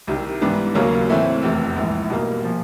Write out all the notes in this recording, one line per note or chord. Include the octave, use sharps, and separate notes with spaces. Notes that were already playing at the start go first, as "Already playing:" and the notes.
C2 C3 D#3 G3
G#2 E3 G3 B3 D4
D#2 C#3 F#3 A#3 C#4
A2 E3 A3 C4 E4
F1 E2 C3
A#1 G#2 E3
B2 G3 A#3
A#2 F3